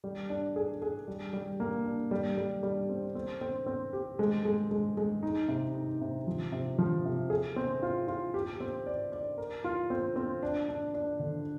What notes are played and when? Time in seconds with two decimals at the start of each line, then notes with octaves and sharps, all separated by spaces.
0.04 G3
0.30 D4
0.56 G#4
0.82 G#4
1.07 G3
1.33 G3
1.60 A#3
1.85 D4
2.11 G3
2.37 G3
2.63 G3
2.89 C4
3.15 C4
3.41 C4
3.66 C4
3.93 G4
4.19 G#3
4.45 G#3
4.71 G#3
4.97 G#3
5.23 D#4
5.48 C3
5.75 D#4
6.01 C3
6.27 F3
6.52 C3
6.78 F3
7.05 C3
7.30 G#4
7.56 C4
7.82 F4
8.08 F4
8.34 G4
8.60 C4
8.86 D5
9.12 D5
9.38 A#4
9.64 F4
9.90 C4
10.16 C4
10.43 D4
10.69 D4
10.94 D4
11.19 D3